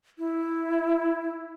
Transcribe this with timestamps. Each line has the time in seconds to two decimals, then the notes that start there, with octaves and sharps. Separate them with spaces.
0.19 E4